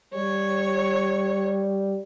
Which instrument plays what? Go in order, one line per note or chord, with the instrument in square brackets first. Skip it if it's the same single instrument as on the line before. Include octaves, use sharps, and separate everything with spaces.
[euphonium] G3 [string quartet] C#5